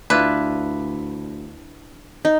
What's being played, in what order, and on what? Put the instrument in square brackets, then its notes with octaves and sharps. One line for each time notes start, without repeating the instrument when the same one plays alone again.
[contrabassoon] D2 [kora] D4 E4 F4 [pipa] B4
[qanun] D#4